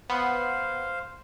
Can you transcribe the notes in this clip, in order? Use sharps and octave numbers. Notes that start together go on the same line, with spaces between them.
B3 C5 F5